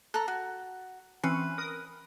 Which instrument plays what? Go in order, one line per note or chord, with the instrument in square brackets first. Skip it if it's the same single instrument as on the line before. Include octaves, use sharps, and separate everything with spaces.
[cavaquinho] A4 A#5 [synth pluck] F#6
[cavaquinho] F#4
[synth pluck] E3 C4 C#4 [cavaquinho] B4
[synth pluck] A#4 D#6